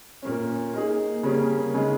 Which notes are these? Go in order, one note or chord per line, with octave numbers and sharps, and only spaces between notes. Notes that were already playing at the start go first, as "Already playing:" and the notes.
A#2 A#3 C#4
A#3 D#4 G#4
C#3 G3 A#3 C#4 G#4
C#3 G#3 D#4 G#4